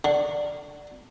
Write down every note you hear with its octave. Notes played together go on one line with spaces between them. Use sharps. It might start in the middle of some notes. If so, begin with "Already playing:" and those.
D3